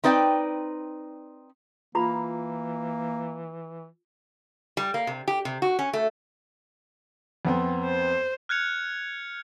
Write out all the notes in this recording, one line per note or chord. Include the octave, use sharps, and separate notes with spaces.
C4 D#4 B4 D5 F#5 G5
E3 A#3 F4 A#5 B5
G3
A#3
C3
G4
C3
F#4
C#4
A3
F2 B3 C4
C5
F6 F#6 G#6 C#7 F7